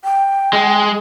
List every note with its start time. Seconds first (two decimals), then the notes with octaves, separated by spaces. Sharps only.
0.04 G5
0.53 G#3